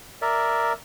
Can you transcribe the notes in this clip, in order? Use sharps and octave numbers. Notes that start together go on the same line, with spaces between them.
A#4 D5 E5